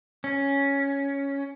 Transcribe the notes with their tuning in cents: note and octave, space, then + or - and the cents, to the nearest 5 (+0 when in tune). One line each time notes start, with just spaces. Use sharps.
C#4 +5